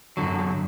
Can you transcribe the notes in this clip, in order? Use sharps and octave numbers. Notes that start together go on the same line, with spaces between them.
F#2 D3 F#3